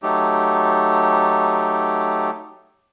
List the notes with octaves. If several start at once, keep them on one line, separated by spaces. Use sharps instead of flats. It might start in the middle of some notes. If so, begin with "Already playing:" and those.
F#3 A3 D#4 G4